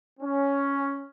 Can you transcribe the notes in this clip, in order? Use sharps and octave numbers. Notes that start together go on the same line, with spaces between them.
C#4